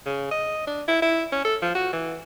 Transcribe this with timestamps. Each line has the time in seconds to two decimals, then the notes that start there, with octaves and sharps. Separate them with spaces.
0.06 C#3
0.31 D#5
0.67 D4
0.88 E4
1.02 E4
1.32 C#4
1.45 A4
1.62 F3
1.75 F#4
1.93 E3